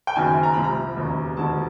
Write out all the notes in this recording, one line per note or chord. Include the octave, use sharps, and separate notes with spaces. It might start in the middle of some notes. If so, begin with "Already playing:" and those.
G5
F#1 F#2 D#3 G#5
A#5
C2 C3 F3 B5
A#5
E1 D#2 C#3
E1 D#2 D3 F3 A5